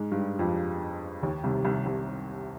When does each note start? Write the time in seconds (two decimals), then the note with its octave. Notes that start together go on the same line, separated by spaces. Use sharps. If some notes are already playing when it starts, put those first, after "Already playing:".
Already playing: G#2 G#3
0.12 G2 G3
0.39 F2 F3
1.22 D#2 D#3
1.44 C2 C3
1.65 C2 C3
1.86 C2 C3